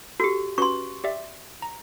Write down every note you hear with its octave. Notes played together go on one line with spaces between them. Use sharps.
F#4 G4 A4
C#4 F#4 B4 C6 C#6
G4 D5 E5
A#5